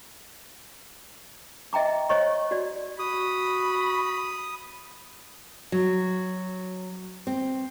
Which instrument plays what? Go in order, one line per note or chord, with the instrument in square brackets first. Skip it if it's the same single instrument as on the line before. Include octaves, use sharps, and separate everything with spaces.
[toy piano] D#5 E5 G5 A#5 D6
C5 C#5 D#5 C#6
F#4 D5
[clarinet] F#4 [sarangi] B5 [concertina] D#6
[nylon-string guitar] F#3
C4